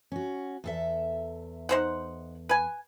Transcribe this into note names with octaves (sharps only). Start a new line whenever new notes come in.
C#4 F#4
E2 A4 E5
D#4 C5 F#5
B4 G#5